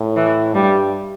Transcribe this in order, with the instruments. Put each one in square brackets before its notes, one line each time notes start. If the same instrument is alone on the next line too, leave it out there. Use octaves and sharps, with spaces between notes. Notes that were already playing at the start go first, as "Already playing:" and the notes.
Already playing: [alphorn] A2
[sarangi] E3
[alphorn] G2 [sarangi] G3